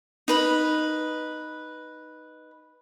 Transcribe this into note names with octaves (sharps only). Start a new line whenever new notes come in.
D#4 B4 B5